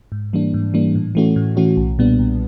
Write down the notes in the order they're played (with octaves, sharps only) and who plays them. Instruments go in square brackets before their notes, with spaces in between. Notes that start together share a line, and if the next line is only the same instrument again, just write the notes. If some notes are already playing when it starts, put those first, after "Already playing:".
[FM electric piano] G#2
E3 G3 A#3 D4
G#2
E3 G3 A#3 D4
A2
E3 A3 C#4 F#4
A2
E3 A3 C#4 F#4
B1
A#2 G3 B3 D4
B1